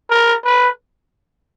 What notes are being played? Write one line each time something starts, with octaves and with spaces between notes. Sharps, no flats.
A#4
B4